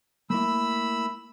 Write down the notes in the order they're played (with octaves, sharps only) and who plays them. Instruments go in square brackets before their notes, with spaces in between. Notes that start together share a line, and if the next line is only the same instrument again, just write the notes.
[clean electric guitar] A3 A#3 E4 [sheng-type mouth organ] B5 E6